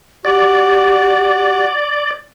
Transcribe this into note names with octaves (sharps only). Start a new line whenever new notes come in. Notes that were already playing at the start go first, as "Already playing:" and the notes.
F#4 G4 D5